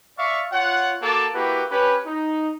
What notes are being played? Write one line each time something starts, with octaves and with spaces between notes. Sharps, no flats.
D5 E5 F5 C#6
F4 C#5 F#5
A#3 F#4 A4 A5 D6
A#3 E4 F#4 G4 B4
C#4 G4 B4
D#4